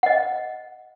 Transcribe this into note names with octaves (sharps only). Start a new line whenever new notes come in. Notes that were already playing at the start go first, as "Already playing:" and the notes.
D#5 F#5